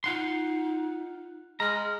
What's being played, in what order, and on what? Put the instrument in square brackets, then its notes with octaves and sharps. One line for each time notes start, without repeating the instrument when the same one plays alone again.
[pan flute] D#4 [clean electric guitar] F4 F#5 C6
[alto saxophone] G#3 [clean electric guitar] A#5 [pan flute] F6